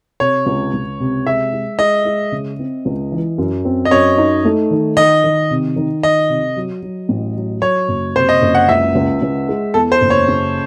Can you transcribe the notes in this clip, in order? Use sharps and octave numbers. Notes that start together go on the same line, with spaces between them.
C3 C#5
C#2
C#2
C3
G#3 E5
G#3
G#3 D#5
G#3
C#3
C4
C#2
E3
F#2
C4
D#5
F#2 C#5
D#4
A3
D#3
D#3 D#5
D#3
C3
D#3
D#3 D#5
C3
F#3
F#3
A1
F#3
F#3 C#5
F#1
C3 C5
D#5
F#1
F#5
C#2 E5
C#2
C#2
G#3
E2 A4
C5
F#1
C#5
C#3